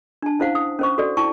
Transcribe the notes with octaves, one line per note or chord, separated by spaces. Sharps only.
D4 A5
C#4 E4 C5 F5 F#5
D#6
C#4 C5 C#6
F#4 A4 D5
E4 G5 A5 C#6